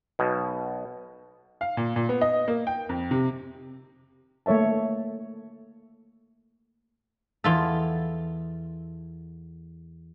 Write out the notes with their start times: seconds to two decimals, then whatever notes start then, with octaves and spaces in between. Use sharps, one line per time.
0.19 B1 B2
1.61 F5
1.77 A#2
1.96 A#2
2.09 B3
2.21 D#5
2.48 A#3
2.67 G5
2.89 F2
3.11 C3
4.46 A3 A#3 C#5 E5 A5
7.44 E2 F4 A4